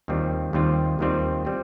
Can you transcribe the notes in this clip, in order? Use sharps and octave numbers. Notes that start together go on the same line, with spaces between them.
D#2 D#3 G3 C4 F4
D#2 D#3 G3 C4 F4
D#2 D#3 G3 C4 F4
G3 C4 F4